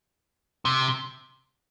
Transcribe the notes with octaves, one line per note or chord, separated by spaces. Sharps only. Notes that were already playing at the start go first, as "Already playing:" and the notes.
C3